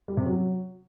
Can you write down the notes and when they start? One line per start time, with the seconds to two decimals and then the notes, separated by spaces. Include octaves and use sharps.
0.08 G3
0.17 C3
0.26 F#3